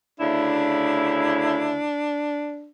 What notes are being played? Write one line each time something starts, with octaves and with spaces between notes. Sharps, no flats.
D2 C#3 D4 E4